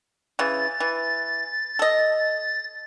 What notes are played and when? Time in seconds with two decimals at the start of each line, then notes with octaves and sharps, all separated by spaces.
0.39 C#3 E3 A6
0.80 E3
1.79 A4 D#5